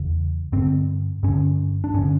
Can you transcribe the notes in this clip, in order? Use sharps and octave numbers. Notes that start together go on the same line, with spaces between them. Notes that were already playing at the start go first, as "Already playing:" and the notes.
Already playing: E2 C#3
G2 D3 C4
G2 D3 C#4
D4
G2 D3 C#4